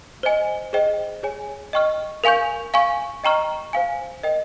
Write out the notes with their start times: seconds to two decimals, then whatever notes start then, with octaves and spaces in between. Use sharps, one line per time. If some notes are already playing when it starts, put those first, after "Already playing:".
0.23 C5 D#5 G#5
0.73 G#4 C5 D#5 G5
1.23 G#4 C#5 G#5
1.73 D#5 G5 C#6 F6
2.24 A#4 F5 G#5 C#6 G6
2.74 F5 G#5 C#6
3.24 D#5 G5 A#5 C#6 F6
3.73 C5 F5 G#5
4.23 A#4 D#5 G5